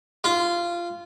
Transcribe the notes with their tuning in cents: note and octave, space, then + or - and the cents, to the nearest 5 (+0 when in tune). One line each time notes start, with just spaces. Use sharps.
F4 -15